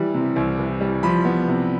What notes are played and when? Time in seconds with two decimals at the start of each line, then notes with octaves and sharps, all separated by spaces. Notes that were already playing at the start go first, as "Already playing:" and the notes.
Already playing: E3 G3
0.14 C3
0.36 C2
0.59 E3
0.81 G3
1.03 F3 B5
1.25 B3
1.48 C3